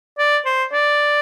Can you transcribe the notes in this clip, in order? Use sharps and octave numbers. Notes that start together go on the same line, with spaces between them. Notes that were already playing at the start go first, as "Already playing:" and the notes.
D5
C5
D5